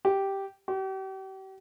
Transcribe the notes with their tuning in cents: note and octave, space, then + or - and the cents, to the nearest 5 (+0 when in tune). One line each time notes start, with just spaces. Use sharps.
G4 -5
G4 -40